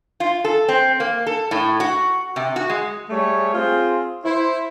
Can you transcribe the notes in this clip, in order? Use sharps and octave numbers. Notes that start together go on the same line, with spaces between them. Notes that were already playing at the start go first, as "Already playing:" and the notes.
F4
A4
C4
A#3
A4
A2
F#4
C3
F#4
G#3
G3 A3 G#4 C#5
C4 F4 G#4 C5
E4 C5